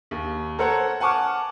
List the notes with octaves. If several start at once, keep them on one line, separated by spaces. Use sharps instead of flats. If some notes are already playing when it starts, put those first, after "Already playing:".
D#2
A4 A#4 C5 C#5 F#5
F#5 G#5 A5 C#6 D6 F6